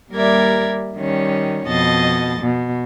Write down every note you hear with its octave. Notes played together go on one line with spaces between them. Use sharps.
D#2 G3 A#4 D5 E5 G#6
D#3 G3 C#4
F2 B2 D#5 A5 A6
B2